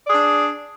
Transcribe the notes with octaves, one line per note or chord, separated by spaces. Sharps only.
D4 G#4 D5